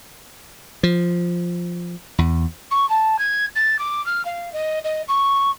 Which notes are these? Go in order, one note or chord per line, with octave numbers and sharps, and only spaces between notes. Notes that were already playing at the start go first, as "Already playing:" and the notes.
F3
E2
C#6
A5
G#6
A6
D6
F6
F5
D#5
D#5
C#6